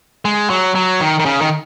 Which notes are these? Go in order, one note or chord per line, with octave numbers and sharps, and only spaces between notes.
G#3
F#3
F#3
D#3
D#3
C#3
D#3